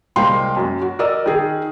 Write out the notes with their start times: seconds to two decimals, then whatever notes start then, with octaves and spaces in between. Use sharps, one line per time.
0.16 C2 G#3 A#3 F5 G5 C6
0.57 F#2
0.82 F#4
0.99 A#4 D5 D#5 E6
1.26 D#3 G#4